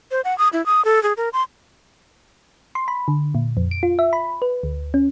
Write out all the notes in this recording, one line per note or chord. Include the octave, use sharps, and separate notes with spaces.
C5
F#5
D#6
E4
D#6
A4
G#4
A#4
C6
C6
B5
D3
A#2
F2
D7
F4
E5
B5
B4
D2
C#4